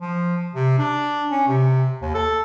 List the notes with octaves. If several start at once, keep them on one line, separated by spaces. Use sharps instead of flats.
F3
C3
D4
C#4
C3
D#2
A4